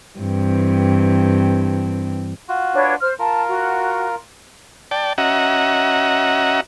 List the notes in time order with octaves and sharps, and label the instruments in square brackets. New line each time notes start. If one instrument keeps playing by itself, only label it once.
[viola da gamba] G2 E3 C4
[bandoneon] F4 F#4
[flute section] D4 B4 C#5
C5 F6
[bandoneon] F4 A#4 [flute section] A5
[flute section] F#4
[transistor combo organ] D5 G5 A5
C#4 F#4 D#5 E5 F#5 A#5